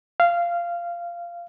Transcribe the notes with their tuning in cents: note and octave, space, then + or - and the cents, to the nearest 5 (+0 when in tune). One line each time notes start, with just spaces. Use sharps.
F5 -15